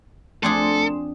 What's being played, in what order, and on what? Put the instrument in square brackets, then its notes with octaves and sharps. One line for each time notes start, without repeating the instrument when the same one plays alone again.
[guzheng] F2 D4 G#4 [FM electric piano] A3 C6 [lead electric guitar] A4